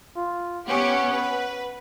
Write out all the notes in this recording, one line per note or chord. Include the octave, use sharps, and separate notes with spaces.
F4
B3 C#4 G4 F#5
B4